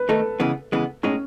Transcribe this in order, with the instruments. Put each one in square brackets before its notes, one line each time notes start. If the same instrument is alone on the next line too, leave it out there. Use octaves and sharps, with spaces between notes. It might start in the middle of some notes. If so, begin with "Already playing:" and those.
Already playing: [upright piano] B4
[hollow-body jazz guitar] D#3 A3 D#4 [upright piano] A4
[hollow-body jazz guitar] C#3 E3 G#3 B3
C#3 E3 G#3 B3
[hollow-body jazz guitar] A2 G#3 D#4 [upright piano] C#4